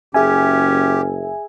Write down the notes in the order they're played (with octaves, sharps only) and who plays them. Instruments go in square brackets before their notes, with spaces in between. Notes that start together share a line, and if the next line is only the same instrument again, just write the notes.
[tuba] F#1 [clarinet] C#4 [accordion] G4 [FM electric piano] G#4 E5 G#5